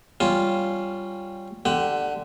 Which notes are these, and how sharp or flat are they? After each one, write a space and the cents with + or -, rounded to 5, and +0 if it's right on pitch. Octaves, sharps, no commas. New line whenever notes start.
G3 +0 C#4 +0 F4 +0
D3 +10 G4 -5 F#5 +20